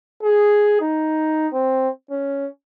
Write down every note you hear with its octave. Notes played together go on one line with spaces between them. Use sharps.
G#4
D#4
C4
C#4